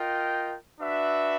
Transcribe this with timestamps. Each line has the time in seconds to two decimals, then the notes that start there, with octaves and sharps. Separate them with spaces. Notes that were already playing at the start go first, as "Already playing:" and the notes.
Already playing: F4 A#4 D#5 G5
0.79 D4 F#4 B4 E5